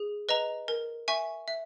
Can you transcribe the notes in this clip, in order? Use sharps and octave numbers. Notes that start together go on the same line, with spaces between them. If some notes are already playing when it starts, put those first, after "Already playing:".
Already playing: G#4
B4 D#5 A#5
A#4
E5 G#5 C#6
E5